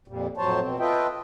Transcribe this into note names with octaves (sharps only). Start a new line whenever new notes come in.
F2 A#2 G3
F2 A2 F#3 C5 C#5 A5
B2 C4
F4 A4 B4 D#5 E5 G5